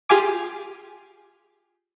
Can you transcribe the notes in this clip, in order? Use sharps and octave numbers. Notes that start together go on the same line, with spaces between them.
F4 G4 G#4 F5 G#5 D6